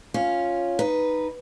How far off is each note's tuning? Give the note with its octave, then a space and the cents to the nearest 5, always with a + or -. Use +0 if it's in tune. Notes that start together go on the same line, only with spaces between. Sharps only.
C#4 +0 F4 +0
D#4 +0 B4 -5